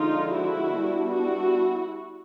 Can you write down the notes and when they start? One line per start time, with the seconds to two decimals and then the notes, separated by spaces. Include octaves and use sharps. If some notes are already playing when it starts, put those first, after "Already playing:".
Already playing: D3 F3 G#3 D#4 F4
0.31 E4 F#4
0.72 G3 B3 D4
1.11 E4 F#4